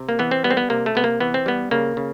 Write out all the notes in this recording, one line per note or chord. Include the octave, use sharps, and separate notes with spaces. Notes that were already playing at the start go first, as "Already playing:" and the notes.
Already playing: C3
A#3
E3 B3
C4
G3 B3
C4
B3
C3 A#3
A3
C3 B3
A#3
E3 B3
C4
G3 B3
C#3 A#3
C#3